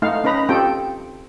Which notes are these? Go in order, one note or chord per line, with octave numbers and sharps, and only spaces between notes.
A3 D#4 F5 F#5
C#4 D#4 B4 A#5 B5
C4 F4 G4 A4 G5